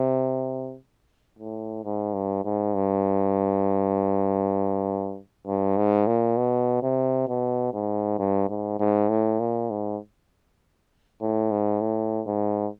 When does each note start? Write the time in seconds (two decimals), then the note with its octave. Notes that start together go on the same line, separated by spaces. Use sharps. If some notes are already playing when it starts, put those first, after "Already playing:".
Already playing: C3
1.39 A2
1.84 G#2
2.14 G2
2.45 G#2
2.75 G2
5.47 G2
5.77 G#2
6.07 A#2
6.37 B2
6.83 C3
7.28 B2
7.74 G#2
8.19 G2
8.49 G#2
8.79 G#2
9.09 A2
9.40 A#2
9.70 G#2
11.21 A2
11.51 G#2
11.81 A2
12.27 G#2